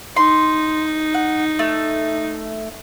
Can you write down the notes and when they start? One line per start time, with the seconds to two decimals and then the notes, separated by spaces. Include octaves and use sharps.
0.16 D#4 C6
1.14 F#5
1.59 A3